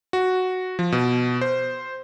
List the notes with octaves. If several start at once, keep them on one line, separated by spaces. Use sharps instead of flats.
F#4
F3
B2
C5